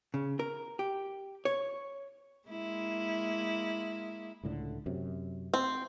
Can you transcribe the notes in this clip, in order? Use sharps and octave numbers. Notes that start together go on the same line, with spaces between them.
C#3
A#4
G4
C#5
G#3 A#3 E4
C#2 A2 D3
F#2 C3
C4